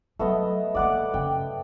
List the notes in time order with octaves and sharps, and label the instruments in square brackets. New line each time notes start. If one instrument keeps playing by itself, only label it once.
[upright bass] F#3 G3 [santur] A3 B3 D#5
[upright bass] A#3 C4 [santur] D5 F#5 D6
[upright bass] F#2 C#3 [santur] G5